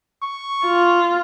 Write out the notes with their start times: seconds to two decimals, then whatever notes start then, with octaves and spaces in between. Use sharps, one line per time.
0.22 C#6
0.66 F4